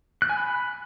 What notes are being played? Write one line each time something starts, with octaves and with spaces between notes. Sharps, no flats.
F#6
G#5
B5